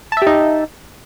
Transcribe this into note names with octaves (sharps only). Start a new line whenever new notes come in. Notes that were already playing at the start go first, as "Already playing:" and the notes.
D#4 G4 E5 A5